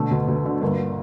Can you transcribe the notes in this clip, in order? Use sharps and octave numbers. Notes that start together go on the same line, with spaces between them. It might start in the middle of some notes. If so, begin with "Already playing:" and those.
Already playing: B2 D3 A3
D2
D2
D3
G1 A#3